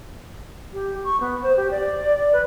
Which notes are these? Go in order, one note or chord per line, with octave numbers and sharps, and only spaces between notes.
G4
C#6
B3
C5
G4
D5
B4